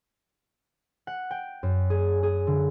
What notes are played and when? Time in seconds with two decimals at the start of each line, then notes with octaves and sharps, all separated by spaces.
1.07 F#5
1.31 G5
1.63 F#2
1.90 G#4
2.23 G#4
2.47 D3